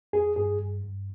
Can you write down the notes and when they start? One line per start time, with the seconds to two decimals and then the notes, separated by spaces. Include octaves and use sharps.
0.13 F2 G#4
0.36 G2 G#4
0.60 G2
0.84 G2